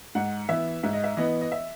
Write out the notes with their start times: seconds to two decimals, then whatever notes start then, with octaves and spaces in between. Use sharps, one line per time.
0.15 G#2 F#5
0.49 E3 B3 E5
0.83 G#2 E5
0.93 D#5
1.04 E5
1.17 E3 B3 D#5
1.41 D#5
1.52 E5